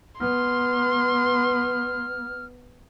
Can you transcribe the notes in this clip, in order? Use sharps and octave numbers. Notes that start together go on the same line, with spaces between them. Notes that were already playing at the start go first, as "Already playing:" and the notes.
B3 C6 F6